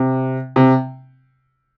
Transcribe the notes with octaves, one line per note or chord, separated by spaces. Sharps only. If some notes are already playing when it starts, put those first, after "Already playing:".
Already playing: C3
C3